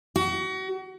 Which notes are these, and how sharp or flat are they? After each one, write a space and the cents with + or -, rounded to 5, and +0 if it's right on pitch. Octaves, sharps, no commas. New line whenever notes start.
F#4 +35